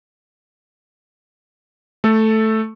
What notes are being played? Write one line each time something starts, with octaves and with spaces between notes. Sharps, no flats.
A3 A4